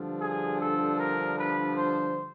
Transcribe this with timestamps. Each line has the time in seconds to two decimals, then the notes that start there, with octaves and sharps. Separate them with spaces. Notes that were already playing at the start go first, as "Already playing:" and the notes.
Already playing: G2 D3 F3
0.21 G#4
0.60 A4
0.98 A#4
1.38 B4
1.77 C5